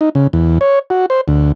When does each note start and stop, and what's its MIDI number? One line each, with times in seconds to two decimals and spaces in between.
0.01 0.09 63
0.15 0.27 49
0.33 0.59 40
0.61 0.79 73
0.90 1.06 66
1.10 1.21 72
1.28 1.52 38